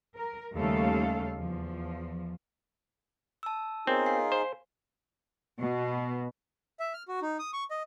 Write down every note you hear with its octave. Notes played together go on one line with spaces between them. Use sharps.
A#4
D#2 C#3 G3 A3 A4 F5
E2 F3
A5 E6
B3 C4 D#4 F4 G#4 A#4 C#5
F5 G#5 C7
C5
B2
E5
F6
F#4
D#4
D#6
C#6
D#5